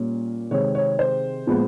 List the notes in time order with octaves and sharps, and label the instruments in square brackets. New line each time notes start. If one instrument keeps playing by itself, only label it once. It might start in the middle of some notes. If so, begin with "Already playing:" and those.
Already playing: [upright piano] A#2 G3 A#3 C#4
C3 D#3 G#3 C4 C#5
C#5
C5
A#2 F3 G#3 B3